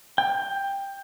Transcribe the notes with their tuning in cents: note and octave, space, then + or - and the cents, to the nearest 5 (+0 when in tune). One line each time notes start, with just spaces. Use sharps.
G5 +15